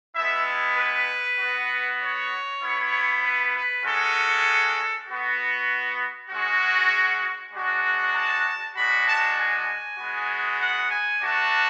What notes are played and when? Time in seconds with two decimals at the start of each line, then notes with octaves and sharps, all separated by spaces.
0.16 G#3 B3 E4 E5
0.77 B4
1.39 B3 F#4
2.01 C#5
2.62 B3 E4
3.22 B4
3.54 B4
3.84 G#3 C#4 F#4 A4
5.08 B3 F#4
6.30 G#3 C#4 F#4
7.53 G#3 D4 F#4
8.15 A5
8.75 G#3 D4 F#4 B5
9.06 A5
9.37 G#5
9.99 G#3 B3 F#4
10.60 F#5
10.90 G#5
11.22 A3 D4 F#4 A5